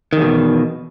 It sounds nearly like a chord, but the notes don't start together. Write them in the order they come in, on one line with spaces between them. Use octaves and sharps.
D#3 E2 B2